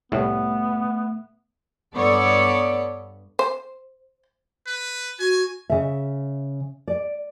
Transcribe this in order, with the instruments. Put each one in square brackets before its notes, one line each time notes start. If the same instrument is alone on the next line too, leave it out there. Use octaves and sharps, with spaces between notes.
[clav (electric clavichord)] C2 A2 [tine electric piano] A3 E5 [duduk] B3
[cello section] G2 B3 A4 C#5 D5
[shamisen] C5
[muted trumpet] B4
[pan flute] F#4 [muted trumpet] G#5
[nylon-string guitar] C#3 E5
D5